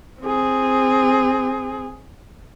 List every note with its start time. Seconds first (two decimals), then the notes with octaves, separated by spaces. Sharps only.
0.21 C4 G#4